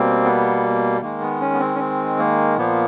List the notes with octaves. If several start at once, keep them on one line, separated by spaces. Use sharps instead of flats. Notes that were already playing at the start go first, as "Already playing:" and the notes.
Already playing: B2 G3 A#3 C4
B3
D#3 G#3 A#3
B3
C#4
B3
C4
C#4
C4
A#3
A#2 F3 A#3 B3